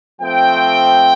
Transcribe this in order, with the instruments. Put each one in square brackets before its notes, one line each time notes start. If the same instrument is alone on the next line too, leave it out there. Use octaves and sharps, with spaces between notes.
[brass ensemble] F3 A3 C4 G5